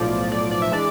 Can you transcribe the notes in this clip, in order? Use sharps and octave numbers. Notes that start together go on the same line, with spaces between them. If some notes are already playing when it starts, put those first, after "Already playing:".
Already playing: B1 A2 F3 D5
D5
D5
E5
E3 G#3 D4 D5